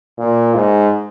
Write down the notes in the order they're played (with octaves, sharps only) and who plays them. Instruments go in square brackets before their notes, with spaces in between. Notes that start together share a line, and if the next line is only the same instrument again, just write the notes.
[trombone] A#2
G#2